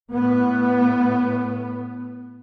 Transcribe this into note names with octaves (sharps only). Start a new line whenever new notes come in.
A2 B3